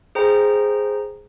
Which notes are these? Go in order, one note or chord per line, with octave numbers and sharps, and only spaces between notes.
G#4 C5 G5 A#5